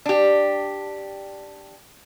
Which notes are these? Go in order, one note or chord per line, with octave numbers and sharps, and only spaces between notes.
D4 G4